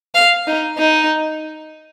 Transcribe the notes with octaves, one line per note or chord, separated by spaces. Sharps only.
F5
D#4
D#4